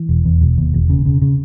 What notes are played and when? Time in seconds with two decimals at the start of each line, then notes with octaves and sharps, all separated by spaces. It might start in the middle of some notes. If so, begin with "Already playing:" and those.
Already playing: E3
0.09 E1
0.25 E2
0.41 E1
0.58 D#2
0.74 E1
0.90 C#3
1.06 C#3
1.22 C#3